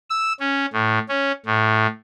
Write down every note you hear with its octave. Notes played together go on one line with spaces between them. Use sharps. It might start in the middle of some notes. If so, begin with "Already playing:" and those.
E6
C#4
A2
C#4
A2